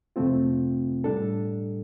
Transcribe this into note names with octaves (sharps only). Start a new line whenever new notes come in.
F2 C3 A3 C4 F4
A2 G3 D4 A4